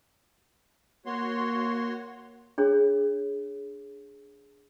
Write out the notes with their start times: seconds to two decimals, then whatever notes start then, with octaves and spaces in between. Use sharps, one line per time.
1.06 A#3 F#4 C#5 C6
2.58 D4 G#4 C#5